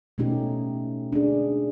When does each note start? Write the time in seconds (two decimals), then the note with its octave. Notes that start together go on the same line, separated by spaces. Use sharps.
0.18 B2 A3 C#4 D#4 G4
1.12 D4 G#4